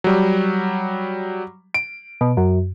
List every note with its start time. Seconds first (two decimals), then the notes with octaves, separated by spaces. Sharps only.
0.04 F#3 G3
1.74 D7
2.21 B2
2.37 F#2